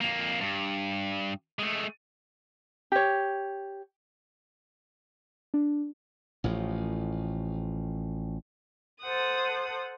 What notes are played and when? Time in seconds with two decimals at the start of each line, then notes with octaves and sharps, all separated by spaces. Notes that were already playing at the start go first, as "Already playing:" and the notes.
0.01 F2 A#3
0.41 G2
1.59 G#3 A3
2.92 G4 C#5
5.54 D4
6.44 A1 A2 F3
9.02 A4 C5 F#5 D#6